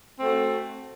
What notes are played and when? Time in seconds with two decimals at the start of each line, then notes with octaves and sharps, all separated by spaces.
0.19 C4
0.22 A3
0.25 F#4